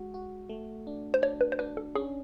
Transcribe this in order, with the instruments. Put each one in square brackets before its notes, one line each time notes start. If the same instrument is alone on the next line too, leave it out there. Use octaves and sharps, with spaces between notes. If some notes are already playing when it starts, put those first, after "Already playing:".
Already playing: [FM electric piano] G#3 F#4
F#4
A3
D4
[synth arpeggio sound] C5
[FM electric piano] D4 [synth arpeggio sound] C#5
[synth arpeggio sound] B4
C5
[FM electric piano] D4 [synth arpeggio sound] B4
[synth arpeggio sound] A4
[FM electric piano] C#4 [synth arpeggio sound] G#4